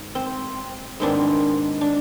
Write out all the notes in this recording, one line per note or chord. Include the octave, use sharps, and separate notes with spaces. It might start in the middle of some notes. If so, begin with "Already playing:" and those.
Already playing: G#2
C4
G#2 D#3 G#3 B3 C4 D4
D4